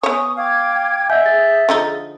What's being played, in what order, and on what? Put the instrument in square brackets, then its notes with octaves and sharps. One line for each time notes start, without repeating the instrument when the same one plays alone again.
[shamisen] B3 C#5 [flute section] G#5 C#6 D#6
[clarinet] F5 [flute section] G5 D6 G#6
[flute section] D#5 F#5 E6 [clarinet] E5 [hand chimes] G#5 G6
[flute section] G#4 [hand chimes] A6
[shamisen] D3 F3 D#4